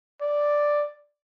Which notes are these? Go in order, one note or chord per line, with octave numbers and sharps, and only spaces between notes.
D5